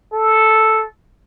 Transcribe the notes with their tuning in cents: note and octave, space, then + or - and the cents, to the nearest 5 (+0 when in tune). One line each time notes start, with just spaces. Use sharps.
A4 -5